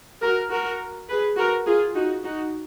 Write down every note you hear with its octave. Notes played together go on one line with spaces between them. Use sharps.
F#4 A#4
F#4 A#4
G#4 B4
F#4 A#4
F4 G#4
D#4 F#4
D#4 F#4